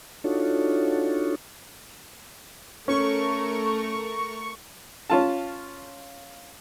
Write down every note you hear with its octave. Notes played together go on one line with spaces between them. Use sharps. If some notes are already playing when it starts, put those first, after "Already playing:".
D4 D#4 F4 F#4 A4 C#5
A3 C#4 A#4 C#6
C#4 F4 A5